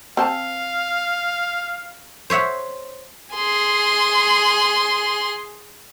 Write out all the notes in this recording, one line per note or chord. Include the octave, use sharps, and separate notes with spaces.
C4 C5 F5 A5
C5 C#5 E5 F#5
G#4 C6